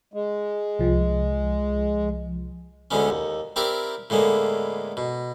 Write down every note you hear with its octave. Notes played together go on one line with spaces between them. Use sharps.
G#3
C2 F3
D2 D3 G#3 B3 C#4
D#2
C4 E4 G4 A#4 D5
A2 D3 G#3 A#3 B3
B2